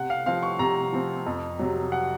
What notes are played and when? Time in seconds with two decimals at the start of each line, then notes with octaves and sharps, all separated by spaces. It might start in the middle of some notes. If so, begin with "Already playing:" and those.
Already playing: C3 F#5
0.10 F5
0.26 F3 C4 F5
0.43 C#6
0.59 C3 A#5
0.92 F3 C4
1.26 F2
1.59 C3 F#3
1.92 F#5